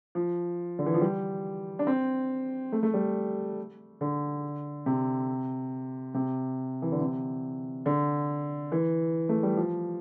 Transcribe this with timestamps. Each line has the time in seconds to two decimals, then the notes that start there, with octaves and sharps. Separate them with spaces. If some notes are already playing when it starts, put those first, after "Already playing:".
0.15 F3
0.79 D3
0.86 E3
0.94 F3
1.01 G3
1.79 D4
1.87 C4
2.72 A3
2.83 A3
2.94 G3
4.01 D3
4.86 C3
6.14 C3
6.82 E3
6.92 D3
7.00 C3
7.86 D3
8.72 E3
9.29 A3
9.43 G3
9.57 F3